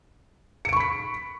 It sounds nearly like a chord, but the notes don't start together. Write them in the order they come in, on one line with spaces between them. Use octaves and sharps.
C#7 D7 C#6 B5 B6